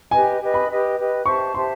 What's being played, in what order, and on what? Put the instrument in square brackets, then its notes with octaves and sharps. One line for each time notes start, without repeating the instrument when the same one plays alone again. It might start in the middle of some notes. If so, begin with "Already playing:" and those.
[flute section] G4 B4 D#5 [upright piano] G#5
[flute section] G4 B4 D#5
[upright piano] B5
[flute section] G4 B4 D#5
G4 B4 D#5
[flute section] G4 C5 E5 A5 [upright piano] C#6
[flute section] G4 C5 E5 A5 [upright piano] C6